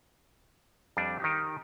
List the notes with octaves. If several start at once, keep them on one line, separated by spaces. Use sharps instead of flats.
F2 G3 D4
D#3 D#4 G4